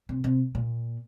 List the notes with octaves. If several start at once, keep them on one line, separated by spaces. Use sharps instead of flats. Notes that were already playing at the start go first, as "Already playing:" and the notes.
C3
C3
A#2